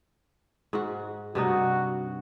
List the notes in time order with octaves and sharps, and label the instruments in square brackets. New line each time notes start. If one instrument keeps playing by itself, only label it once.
[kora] G#2 F#4
[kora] G2 C3 D#4 [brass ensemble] F#4